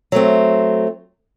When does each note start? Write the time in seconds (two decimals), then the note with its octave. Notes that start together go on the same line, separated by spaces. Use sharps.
0.12 F#3 A3 C4